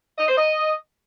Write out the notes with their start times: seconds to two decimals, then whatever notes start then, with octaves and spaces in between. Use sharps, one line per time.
0.18 D#5
0.28 C5
0.37 D#5